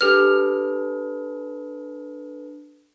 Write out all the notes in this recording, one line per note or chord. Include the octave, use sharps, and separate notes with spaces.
D4 G4 A4 B4 F6